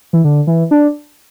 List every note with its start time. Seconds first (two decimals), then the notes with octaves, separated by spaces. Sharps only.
0.13 E3
0.24 D3
0.47 E3
0.71 D4